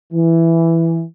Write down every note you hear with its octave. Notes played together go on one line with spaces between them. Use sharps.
E3